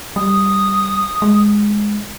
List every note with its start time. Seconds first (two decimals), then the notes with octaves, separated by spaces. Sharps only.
0.16 G3 D#6
1.22 G#3